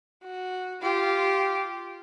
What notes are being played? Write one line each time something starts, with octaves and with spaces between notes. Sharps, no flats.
F#4
F4 G4